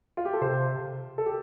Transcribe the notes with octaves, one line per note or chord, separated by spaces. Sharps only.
F4
G4
A4
C3 C5
A4
G4